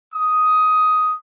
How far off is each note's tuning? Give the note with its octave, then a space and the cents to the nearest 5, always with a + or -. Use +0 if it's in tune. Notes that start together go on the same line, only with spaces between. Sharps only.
D#6 +10